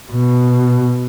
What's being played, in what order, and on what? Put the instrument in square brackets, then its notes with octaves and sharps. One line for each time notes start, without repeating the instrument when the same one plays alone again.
[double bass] B2